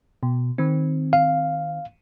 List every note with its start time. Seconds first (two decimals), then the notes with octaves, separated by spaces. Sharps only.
0.23 B2
0.58 D#3 C4
1.13 F5